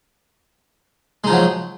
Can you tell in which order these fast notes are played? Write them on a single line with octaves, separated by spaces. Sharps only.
G#3 D#4 F3 F#3